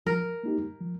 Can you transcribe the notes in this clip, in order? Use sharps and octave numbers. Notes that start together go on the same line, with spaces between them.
F3 A#4
A#3 D#4 G4
F3